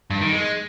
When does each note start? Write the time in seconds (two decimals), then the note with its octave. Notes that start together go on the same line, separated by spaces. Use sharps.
0.10 G2
0.21 D#3
0.32 G#3